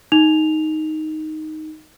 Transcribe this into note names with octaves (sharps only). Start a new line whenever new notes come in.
D#4 F7